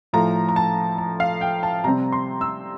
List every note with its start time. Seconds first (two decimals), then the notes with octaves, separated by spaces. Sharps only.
0.13 A2 F3 A3 A#5
0.49 A#5
0.56 A5
0.98 A5
1.20 F5
1.41 G5
1.63 A5
1.84 C3 G3 C4 A#5
2.12 C6
2.41 E6